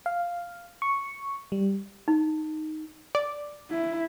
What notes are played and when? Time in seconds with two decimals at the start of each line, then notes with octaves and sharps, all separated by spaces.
0.06 F5
0.82 C#6
1.52 G3
2.08 D#4
3.15 D5
3.71 E4